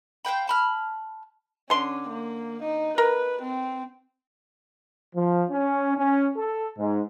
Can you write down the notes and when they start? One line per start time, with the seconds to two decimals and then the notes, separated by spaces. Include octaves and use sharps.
0.25 C5 F5 G5 B5
0.47 A5 B5 F6
1.70 D3 C#4 C6
2.09 A#3
2.63 D#4
2.98 A#4 B4
3.42 C4
5.16 F3
5.50 C#4
5.97 C#4
6.37 A4
6.78 G#2